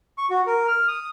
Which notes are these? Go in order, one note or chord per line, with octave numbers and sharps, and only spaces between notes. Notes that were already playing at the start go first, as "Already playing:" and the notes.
C#6
F#4
A#4
F6
D#6